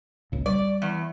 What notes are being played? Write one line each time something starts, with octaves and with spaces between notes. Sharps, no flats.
G#1 C#2 A#2
G3 D5
E2